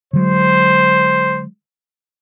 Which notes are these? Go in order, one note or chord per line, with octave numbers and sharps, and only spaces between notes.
D3 F#3 G#3 C5